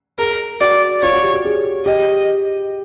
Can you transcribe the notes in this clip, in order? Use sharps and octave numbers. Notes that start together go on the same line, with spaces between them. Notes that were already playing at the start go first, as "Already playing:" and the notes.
G#4 A#4
F#4 D5
F4 C#5
F#4
G4
G4
G#4
G4 D#5